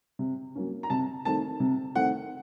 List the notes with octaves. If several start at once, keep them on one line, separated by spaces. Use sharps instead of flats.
C3
F#3 A#3 C#4
A#5
C3 A5
D#3 A3 C4 A5
C3
D#3 A3 C4 F#5